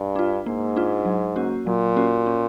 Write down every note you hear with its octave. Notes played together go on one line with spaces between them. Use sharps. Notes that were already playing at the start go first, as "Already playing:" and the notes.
Already playing: G2
D4 F4
G#2 A#3
D4 F4
F#3
A#3 C#4 F#4
A#2 F#3
A#3 C#4 F#4
C#4